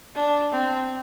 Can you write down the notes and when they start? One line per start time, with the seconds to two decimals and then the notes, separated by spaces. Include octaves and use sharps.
0.15 D4
0.52 C4